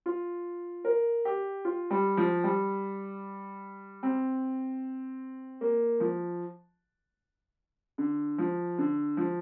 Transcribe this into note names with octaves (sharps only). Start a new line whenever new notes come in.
F4
A#4
G4
F4
G3
F3
G3
C4
A#3
F3
D3
F3
D3
F3